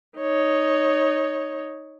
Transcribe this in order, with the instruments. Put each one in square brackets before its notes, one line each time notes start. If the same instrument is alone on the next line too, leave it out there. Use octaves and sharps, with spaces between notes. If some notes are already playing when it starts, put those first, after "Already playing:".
[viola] D#4 C#5